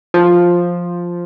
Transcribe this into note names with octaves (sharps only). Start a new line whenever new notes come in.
F3